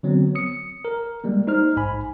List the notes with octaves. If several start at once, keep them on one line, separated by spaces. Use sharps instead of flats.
D3 F#3 B3 C4
D#6 C#7
A#4
G3 G#3 A#3
D#4 C5 F6
A#1 G#2 G#5 B5